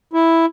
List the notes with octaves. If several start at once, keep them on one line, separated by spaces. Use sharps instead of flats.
E4